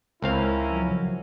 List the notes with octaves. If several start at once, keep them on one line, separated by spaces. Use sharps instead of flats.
C#2 C4 C#4 E4 A#4 F5
F3 F#3